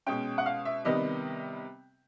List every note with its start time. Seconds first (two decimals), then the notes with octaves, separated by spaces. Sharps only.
0.07 B2 G#3 C#4 G5
0.38 F#5
0.46 F5
0.65 E5
0.85 C3 D#3 G3 B3 D#5